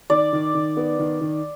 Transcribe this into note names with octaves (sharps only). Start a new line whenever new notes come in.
D#3 D5
D#3
D#3
B3
D#3
D#3